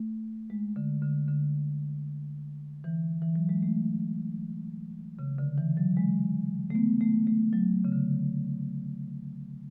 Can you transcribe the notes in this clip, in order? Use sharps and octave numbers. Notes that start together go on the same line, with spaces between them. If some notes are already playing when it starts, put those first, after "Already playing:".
Already playing: A3
G#3
D3
D3
D3
E3
E3
F#3
G#3
A3
C#3
D3
E3
F#3
G#3
A3
B3
A3
A3
F#3
C#3
D3